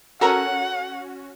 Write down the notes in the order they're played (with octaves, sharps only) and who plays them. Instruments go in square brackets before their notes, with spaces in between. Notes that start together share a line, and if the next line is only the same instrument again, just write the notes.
[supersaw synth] C#4 F#4 [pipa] A4 A#4 A#5 [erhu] F#5